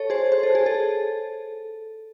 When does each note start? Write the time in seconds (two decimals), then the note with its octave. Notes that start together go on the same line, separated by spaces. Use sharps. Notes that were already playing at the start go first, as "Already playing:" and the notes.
Already playing: A4 C#5
0.10 G#4 C5
0.32 C5
0.43 A4
0.55 G#4
0.66 A4